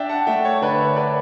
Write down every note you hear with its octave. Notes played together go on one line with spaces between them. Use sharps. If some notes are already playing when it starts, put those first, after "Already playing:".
Already playing: D4 E5 G5
F#5 A5
A3 E5 G5
C#5
D3 B4 D5
C#5
B4 D5